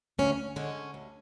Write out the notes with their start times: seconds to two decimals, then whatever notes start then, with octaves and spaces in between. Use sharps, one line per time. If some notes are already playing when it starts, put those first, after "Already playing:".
0.19 D2 C#4
0.56 D3 G#3 C#4
0.94 D2